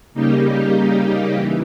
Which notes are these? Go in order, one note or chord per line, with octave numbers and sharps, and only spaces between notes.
C#3 G3 A#3 D#4 G4
E3